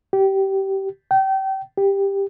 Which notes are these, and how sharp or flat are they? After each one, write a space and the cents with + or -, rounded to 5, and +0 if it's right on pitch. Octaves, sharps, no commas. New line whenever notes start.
G4 -20
G5 -30
G4 +10